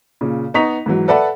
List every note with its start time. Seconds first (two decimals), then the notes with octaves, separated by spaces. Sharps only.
0.21 A#2 C#3
0.54 B3 D#4 A#5 C#6 B6 F7
0.86 G#2 E3 F#3
1.08 A4 B4 D5 E5 F#5 B5